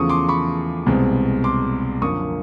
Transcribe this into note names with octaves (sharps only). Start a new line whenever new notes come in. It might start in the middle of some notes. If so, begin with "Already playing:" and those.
Already playing: E2 C#3 F3 A3 C#6 D#6
C6 D6
B5 C#6
C2 B2 G#3 C4
C6 D6
F#2 D3 F3 A#3 C#6 D#6